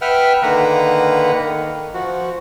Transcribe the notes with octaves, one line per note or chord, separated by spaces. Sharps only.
B4 E5 F#5 G5 F6
D3 D#3 A#3 B4 F#5 A#5
D#3
F3 F#4